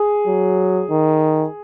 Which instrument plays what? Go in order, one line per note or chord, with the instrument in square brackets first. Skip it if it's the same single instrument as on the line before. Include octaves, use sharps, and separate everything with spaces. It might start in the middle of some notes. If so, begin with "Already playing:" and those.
Already playing: [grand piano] G#4
[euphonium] F#3
D#3